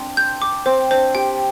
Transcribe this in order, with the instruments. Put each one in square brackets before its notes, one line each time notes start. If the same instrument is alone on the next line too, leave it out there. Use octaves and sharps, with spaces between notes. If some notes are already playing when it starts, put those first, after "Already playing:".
Already playing: [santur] C4 D4
[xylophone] G6
D6
[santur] C4 [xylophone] C5
[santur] D4 [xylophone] C5
[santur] G4 [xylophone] G5